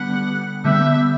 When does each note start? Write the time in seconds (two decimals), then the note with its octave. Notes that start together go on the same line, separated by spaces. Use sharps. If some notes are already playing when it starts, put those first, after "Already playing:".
Already playing: D3 G3 B3 F#5
0.64 D3 G3 B3 E5